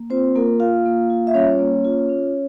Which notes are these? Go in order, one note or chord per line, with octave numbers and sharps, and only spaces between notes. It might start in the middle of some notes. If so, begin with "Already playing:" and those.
Already playing: A#3
C4 F4 C5
A#3 F4 A#4
A#3 F4 F5
A#3
F4
E5
G3 C#4 C#5
A#3
F4
C#4